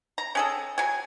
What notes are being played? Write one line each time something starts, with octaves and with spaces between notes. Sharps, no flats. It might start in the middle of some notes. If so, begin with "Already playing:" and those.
A#5
C#4 G#4 A4
F#3 G#5